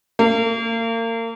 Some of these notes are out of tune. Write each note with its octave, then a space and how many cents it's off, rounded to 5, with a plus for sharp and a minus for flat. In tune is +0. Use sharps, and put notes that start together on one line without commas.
A#3 -35